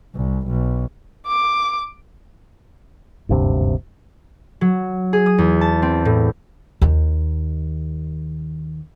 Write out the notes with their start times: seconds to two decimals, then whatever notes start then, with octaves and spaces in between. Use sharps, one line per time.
0.16 C2
0.48 B1
1.27 D6
3.29 F#1 D2 G2 C3
4.61 F#3
5.13 G#4
5.26 D#6
5.38 E2
5.61 A5
5.82 C4
6.05 A2
6.82 D#2 D#3